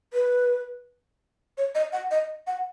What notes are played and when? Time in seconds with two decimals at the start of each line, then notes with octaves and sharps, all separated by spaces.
0.13 B4
1.58 C#5
1.75 D#5
1.93 F#5
2.11 D#5
2.47 F#5